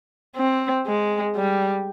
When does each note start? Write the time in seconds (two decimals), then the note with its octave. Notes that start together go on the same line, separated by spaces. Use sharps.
0.36 C4
0.86 G#3
1.36 G3